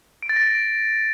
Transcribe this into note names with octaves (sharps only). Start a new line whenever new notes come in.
D7
A6
A#6
D7